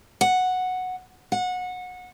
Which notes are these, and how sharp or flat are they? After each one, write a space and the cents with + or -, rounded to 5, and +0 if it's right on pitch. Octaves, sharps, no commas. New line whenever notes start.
F#5 -5
F#5 -25